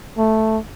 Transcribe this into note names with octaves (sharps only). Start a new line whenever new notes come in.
A3